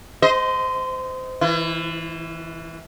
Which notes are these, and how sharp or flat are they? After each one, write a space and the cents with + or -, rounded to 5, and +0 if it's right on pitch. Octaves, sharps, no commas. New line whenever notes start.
C5 -25 D#5 +10
E3 -20 E4 +40